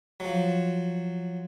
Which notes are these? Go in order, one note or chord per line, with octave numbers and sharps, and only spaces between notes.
F3 F#3